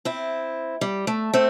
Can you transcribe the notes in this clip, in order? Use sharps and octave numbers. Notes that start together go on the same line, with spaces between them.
C4 E4
G3
A3
A3 C4